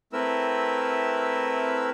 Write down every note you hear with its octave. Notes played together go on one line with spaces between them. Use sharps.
A3 C4 E4 A#4 B4 E6